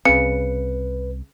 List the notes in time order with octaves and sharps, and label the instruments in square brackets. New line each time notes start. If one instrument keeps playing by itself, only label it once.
[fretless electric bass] C2 C4 [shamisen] C#3 [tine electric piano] B4 [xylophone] C#7